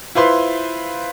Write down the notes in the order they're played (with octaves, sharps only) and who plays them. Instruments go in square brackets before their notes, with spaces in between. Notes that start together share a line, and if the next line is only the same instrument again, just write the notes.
[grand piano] E4 F4 B4 C5 C6